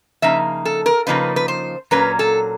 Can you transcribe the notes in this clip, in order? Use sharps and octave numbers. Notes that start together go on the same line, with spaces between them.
C#3 F3 A#3 D#4 E5
A4
A#4
C#3 F3 A#3 D#4 B4
B4
C5
A#2 F#3 A#3 C#4 B4
A4